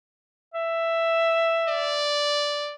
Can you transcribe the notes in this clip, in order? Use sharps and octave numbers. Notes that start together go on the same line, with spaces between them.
E5
D5